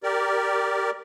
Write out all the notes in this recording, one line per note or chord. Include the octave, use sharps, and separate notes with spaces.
G4 A#4 D5